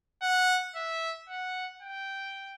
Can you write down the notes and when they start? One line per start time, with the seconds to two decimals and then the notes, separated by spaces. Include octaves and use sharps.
0.22 F#5
0.76 E5
1.30 F#5
1.83 G5